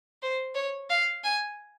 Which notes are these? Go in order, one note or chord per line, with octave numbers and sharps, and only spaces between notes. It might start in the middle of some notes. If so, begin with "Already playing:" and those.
C5
C#5
F5
G#5